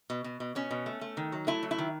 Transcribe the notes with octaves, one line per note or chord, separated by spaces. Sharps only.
B2
B2
B2
B2 C#4
B2
A3
A3
D#3
F#3
A3 E4
F#3
E4
D#3